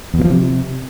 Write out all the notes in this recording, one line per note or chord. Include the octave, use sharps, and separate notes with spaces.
E2
B2
F3
C3